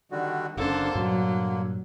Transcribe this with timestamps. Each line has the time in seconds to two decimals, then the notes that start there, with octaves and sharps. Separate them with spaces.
0.11 D3 D#3 G3 F#4
0.57 F#1 D3 A#3 C#4 D4 A4 C5
0.95 G2 A#2 F#3